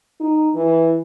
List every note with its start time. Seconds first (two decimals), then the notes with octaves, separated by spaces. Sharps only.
0.21 D#4
0.55 E3